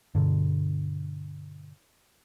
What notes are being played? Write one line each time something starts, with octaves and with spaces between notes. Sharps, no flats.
G2 B2 D3